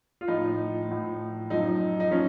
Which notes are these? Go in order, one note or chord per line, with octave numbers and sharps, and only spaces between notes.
F4
A2 F3 D#4
A2 F3
F#2 F3 D#4
D#4
F3 C#4